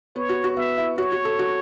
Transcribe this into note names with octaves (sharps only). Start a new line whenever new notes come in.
B3 C#5
F#4
F#4
B3 E5
E4
F#4 C#5
F#4
A4
F#4